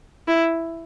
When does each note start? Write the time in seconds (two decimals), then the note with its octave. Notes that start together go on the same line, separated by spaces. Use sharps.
0.27 E4